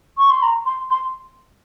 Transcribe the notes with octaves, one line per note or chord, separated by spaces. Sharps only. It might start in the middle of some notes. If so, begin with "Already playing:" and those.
C#6
C6
A#5
C6
C6